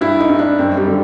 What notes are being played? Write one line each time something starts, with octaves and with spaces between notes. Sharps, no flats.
G2 E4
D#4
G2
D4
F#2 C4
G3
D3